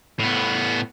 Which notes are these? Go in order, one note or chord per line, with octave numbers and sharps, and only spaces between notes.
A2 B3